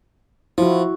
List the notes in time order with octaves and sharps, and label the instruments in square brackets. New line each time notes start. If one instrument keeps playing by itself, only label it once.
[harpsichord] F3 [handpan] E4 F#4